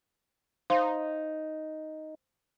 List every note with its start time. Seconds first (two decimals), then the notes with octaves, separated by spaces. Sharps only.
0.70 D#4 C5 F5 C6